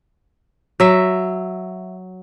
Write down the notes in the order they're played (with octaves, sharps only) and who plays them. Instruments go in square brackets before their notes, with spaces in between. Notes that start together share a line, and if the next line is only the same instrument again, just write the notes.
[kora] F#3 E5